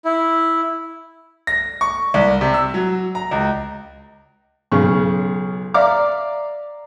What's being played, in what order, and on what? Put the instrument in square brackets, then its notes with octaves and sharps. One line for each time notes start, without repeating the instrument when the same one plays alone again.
[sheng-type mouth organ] E4
[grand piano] A#6
C#6
C2
C3
E6
F#3
A#5
C#2
[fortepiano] B1 C#3 C#6
D5 E5 F5 A#5 D6